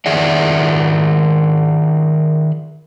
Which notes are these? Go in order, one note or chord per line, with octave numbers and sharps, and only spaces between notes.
D#3 G#4 D5 E5 F#5